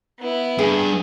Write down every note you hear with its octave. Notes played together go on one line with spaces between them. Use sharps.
B3 E4
G2 G#4